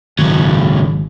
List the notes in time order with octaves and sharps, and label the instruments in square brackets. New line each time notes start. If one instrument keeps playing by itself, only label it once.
[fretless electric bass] G#1 [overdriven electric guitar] C#2 F#3